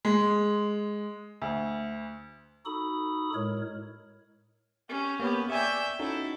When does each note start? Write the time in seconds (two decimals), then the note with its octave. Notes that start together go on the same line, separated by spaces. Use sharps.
0.05 G#3
1.42 D2
2.66 D#4 F#4 A4 B5 D#6
3.34 A2 G#3 A#4 C#5
4.89 C#4 G4
5.20 A#3 B3 G4 C#5 B5
5.50 D5 E5 G5 G#5 C#6
5.99 C#4 D#4 E4 F#4 A4